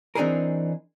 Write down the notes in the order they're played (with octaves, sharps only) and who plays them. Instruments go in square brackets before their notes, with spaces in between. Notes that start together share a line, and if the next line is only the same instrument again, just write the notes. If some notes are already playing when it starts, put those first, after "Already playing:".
[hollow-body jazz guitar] E3 C4 D4 D#4 G#4 A#4